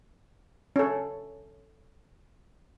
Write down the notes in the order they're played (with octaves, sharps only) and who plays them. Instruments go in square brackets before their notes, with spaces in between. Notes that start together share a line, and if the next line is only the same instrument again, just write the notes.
[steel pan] C#4 A4